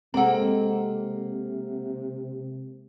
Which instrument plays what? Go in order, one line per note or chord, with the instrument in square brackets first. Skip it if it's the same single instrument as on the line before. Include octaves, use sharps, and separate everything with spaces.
[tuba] C3 [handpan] G#3 C4 [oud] A#3 A4 [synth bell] F#5 A#5